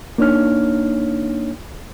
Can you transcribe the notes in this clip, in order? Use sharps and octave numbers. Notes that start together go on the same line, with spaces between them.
A#3 D4 D#4 C#5 F6